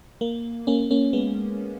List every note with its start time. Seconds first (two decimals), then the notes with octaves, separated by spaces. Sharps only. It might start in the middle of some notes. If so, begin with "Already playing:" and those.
0.21 A#3
0.67 A#3 C#4
0.91 A#3 C#4
1.13 G#3 B3